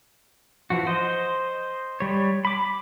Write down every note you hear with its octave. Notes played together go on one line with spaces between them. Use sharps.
E3 F3 F#4
C5 D#5
G3 C#5
B5 D6